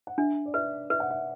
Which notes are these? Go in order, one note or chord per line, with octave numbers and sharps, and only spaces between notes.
F#5
D4 E5
D5
B4 E5
B4 E5
F#5
E5